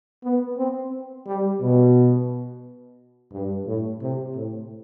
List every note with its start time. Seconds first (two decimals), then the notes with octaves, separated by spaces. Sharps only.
0.24 B3
0.58 C4
1.27 G3
1.61 B2
3.33 G2
3.67 A2
4.01 C3
4.35 A2